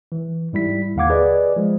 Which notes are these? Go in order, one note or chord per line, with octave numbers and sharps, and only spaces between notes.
E3
G#2 G3 E4 B6
D#2 D3 F5 F#5 D6 G#6
G#4 B4 D5 D#5
F3 G#3